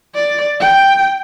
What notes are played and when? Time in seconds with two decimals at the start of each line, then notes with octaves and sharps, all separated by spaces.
0.15 D5
0.60 G5